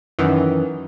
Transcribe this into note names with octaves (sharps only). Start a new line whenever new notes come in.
F#2 D#3 E3